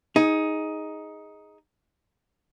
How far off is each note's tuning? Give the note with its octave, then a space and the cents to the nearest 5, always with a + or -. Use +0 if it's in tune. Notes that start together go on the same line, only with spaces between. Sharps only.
D#4 +10 G#4 +0